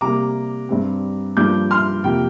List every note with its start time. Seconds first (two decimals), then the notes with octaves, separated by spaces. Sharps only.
0.01 C3 G3 A#3 A#5 D6
0.69 G2 G3 C4
1.37 G2 F3 A#3 D6 G6
1.71 C6 F6
2.04 F2 C3 A#3 G5